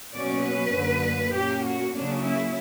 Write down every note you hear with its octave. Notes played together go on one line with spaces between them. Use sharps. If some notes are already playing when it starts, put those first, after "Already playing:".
B2 F#3 A#3 C#4 D5
B4
F#2 D3 A#3
A#2 A#3 C#4 G4
F#4
C#3 F#3 A#3 C#4 D4
E4